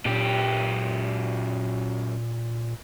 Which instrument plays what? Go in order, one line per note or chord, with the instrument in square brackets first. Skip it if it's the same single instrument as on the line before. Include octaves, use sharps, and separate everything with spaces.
[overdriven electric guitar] F#2 G4 [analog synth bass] A#2